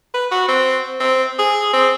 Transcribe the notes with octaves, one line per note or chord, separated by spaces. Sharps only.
B4
F#4
C4
C4
G#4
C4